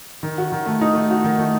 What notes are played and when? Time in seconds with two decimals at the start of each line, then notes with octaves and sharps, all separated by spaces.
0.23 D#3
0.38 F#4
0.52 D#3
0.66 A3
0.81 D#4
0.95 A3
1.11 F#4
1.24 D#3
1.39 A3